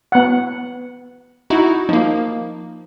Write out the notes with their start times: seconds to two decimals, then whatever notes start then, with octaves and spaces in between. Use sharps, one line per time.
0.12 B3 F#5
1.50 D#4 E4 F#4
1.89 F3 A#3 D#4